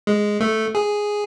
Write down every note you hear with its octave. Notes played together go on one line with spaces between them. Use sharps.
G#3
A3
G#4